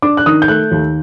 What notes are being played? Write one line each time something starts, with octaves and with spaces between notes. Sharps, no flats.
D4 D6
F#6
D#3 D#6
G6
A3 F#6
D#2